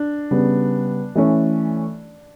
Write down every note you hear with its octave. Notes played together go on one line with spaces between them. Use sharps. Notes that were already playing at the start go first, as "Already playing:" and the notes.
Already playing: D4
C#3 G3 B3
E3 A3 C#4